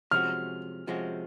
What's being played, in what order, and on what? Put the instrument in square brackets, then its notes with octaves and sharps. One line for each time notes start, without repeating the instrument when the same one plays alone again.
[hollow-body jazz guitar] C3 F3 G#3 C#4 F#4 [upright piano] F6
[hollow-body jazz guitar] C3 F3 G#3 C#4 F#4